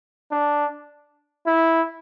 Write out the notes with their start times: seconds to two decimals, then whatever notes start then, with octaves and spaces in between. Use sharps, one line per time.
0.31 D4
1.47 E4